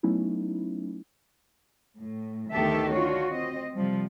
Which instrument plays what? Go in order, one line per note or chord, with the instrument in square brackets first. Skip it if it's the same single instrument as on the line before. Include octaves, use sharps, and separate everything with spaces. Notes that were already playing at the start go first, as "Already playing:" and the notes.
[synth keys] F#3 A3 B3 C#4 D#4 E4
[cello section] A2
D2 D#3 B3 G4 A4 E5
D4 F4 F#4 C#5
C4 D#5
C3 F3 G3